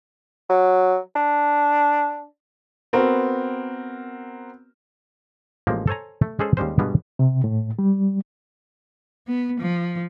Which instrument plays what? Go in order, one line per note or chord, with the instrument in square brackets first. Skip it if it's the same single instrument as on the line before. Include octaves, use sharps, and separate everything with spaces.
[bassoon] F#3
D4
[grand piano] B3 C4 F#4 A#4
[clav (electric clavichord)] A1 F3 G#3 A#3
A4 C5 C#5 G#5 A#5
A3
G#3 C#4 G#4 A4 C5
D#2 G3 G#3 C#4 C5
G2 B2 G3 G#3 B3
[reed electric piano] C3
A2
G3
[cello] B3
F3